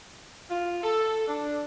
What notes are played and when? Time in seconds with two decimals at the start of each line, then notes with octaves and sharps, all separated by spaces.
0.50 F4
0.84 A4
1.28 D4